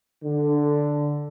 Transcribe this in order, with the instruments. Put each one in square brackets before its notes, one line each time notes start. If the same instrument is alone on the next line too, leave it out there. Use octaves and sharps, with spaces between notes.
[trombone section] D3